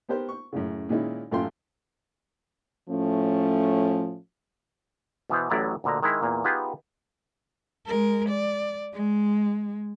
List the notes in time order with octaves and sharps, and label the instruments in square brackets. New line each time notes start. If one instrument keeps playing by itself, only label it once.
[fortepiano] B3 G4 A#4 C5
C#6
F#2 A2 C#3
A#2 D#3 G#3 C#4 D#4 E4
A1 F#2 A3 F4 G5 C6
[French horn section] A2 F3 A3 C#4
[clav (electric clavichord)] B2 E3 B3 C5
A1 A2 F#3 E4 D5 A#5
D2 A#2 D3 D#5 A#5
D#3 G#3 E4 A#5
E2 A#2 A#3
B3 D#4 F4 G4 G#4 B4
[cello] G#3 A#4
D5
G#3